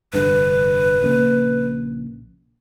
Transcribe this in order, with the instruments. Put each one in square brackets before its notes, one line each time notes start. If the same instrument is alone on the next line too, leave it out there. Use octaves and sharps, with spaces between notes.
[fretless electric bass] F1 G2 D3 [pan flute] B4
[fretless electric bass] A#1 C#3 A#3